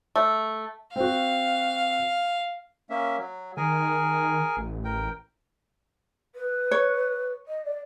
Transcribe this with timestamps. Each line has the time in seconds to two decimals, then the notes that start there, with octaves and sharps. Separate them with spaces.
0.16 A3
0.96 C4 F#4 F5
2.90 A#3 C#4 E5
3.18 F#3
3.57 D#3 G#4 A#4 G#5
4.57 A1
4.84 A#4 G5
6.35 B4
6.71 C#5
7.48 D#5
7.65 D5